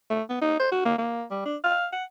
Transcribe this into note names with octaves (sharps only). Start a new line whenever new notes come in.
A3
B3
D#4
C5
F#4
A#3
A#3
G3
D4
F5
F#5